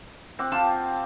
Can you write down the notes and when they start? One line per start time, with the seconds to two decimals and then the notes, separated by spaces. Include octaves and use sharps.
0.39 C4 F#5 D6
0.52 F4 G4 A5